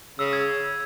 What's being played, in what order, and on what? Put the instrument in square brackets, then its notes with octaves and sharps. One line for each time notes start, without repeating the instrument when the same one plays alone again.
[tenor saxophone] C#3 [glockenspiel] E6
[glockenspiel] E6 G#6